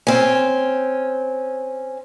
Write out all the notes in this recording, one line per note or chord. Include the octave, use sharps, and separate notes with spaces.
C4 C#4